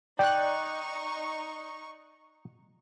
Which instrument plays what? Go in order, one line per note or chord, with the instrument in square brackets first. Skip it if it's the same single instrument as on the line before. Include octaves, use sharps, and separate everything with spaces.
[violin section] D#4 C#6 [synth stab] D5 F#6 [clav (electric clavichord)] G5